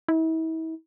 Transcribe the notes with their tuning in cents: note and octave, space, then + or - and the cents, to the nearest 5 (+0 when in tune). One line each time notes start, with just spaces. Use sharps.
E4 -40